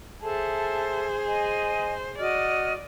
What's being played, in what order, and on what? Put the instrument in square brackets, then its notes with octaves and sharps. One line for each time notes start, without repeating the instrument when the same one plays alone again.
[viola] G#4 C5 [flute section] A4 E5 A5
[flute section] D#5 G#5
[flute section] F#4 D#5 F6 [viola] D5